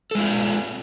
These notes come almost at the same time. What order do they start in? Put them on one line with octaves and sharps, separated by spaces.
A4 G#3 F4 C4